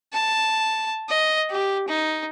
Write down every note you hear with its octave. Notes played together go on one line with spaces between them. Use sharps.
A5
D#5
G4
D#4